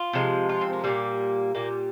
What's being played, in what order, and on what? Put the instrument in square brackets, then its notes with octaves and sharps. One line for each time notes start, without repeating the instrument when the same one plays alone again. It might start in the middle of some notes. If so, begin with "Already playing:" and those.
Already playing: [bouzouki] F4
C3 F3 G#3
F4
C4
A#3
A#2 G3 A#3
A#2 G3 A#3